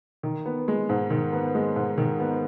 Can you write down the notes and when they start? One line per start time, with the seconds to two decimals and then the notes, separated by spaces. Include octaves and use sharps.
0.23 D#3
0.46 B3
0.68 G#3
0.89 G#2
1.10 D#3
1.33 B3
1.55 G#3
1.76 G#2
1.98 D#3
2.20 B3